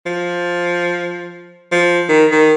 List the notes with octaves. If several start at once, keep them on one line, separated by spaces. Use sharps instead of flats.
F3
F3
D#3
D#3